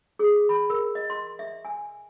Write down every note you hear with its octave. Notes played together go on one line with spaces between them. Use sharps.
G#4
B5
A#4
D#5
C6
E5
G#5